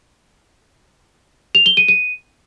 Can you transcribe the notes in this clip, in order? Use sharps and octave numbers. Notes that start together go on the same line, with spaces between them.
F7
G7
D#7
D#7